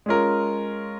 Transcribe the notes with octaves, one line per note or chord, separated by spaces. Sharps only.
G#3 C#4 F4 A#4